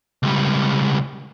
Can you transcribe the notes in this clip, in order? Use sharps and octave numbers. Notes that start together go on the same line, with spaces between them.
C#2 G3